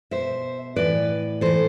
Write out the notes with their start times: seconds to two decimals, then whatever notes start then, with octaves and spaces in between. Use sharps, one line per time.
0.11 B2 C5 E5
0.76 A2 E3 B4 D5
1.41 A2 E3 A4 C5